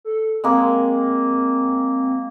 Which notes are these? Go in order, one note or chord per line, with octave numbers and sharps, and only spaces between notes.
A4
G#3 A#3 C4